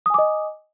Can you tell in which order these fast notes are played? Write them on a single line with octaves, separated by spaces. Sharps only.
D#6 G#5 D6 D#5